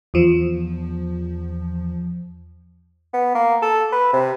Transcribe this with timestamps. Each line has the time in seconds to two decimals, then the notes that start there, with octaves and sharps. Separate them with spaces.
0.14 E2 F3
3.13 B3
3.35 A#3
3.62 A4
3.93 B4
4.13 C3